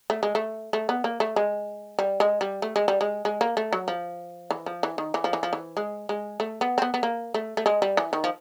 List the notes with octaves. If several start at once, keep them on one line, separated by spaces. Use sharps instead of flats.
A3
G#3
A3
A3
B3
A#3
A3
G#3
G3
G#3
G3
A3
G#3
G3
G#3
G#3
A#3
A3
F#3
F3
E3
F3
E3
D#3
E3
F3
E3
F3
E3
G#3
G#3
A3
B3
C4
B3
B3
A#3
A3
A3
G#3
G3
E3
D#3
F3